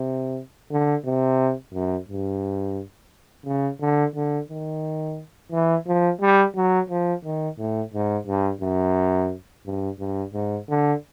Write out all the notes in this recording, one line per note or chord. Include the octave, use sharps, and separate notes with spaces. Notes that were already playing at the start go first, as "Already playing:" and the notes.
Already playing: C3
D3
C3
F#2
G2
C#3
D3
D3
D#3
E3
F3
G3
F#3
F3
D#3
A2
G#2
G2
F#2
G2
G2
G#2
D3